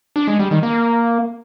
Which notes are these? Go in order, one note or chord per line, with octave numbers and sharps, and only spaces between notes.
D4
G#3
G3
D#3
A#3